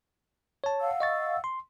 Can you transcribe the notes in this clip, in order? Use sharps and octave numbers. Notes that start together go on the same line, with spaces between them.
C#5 A5
F5 F#5 E6
D#5 C#6 A6
C6